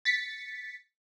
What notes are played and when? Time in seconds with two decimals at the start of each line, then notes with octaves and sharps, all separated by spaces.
0.05 A6 B6 C#7